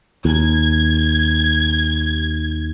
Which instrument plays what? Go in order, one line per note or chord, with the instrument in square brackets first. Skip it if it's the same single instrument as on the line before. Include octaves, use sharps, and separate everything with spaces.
[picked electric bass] D#2 [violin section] G#6